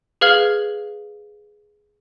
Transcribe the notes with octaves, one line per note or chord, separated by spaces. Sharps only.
G#4 B4 F5 F6 G#6 F#7